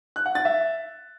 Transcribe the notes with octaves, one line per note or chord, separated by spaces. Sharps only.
F#6
F#5
A6
E5